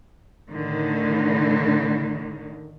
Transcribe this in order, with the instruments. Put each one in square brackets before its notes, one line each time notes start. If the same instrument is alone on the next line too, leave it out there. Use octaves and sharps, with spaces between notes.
[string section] A2 D3 D#3